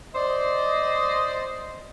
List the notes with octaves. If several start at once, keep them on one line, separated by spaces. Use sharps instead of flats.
C5 D5 D#5